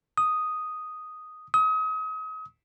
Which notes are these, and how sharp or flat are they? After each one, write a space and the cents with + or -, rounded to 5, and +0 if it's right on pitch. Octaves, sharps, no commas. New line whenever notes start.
D#6 +0
D#6 +35